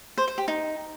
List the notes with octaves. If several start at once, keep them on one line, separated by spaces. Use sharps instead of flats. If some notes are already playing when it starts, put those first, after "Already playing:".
C5
C5
G4
D#4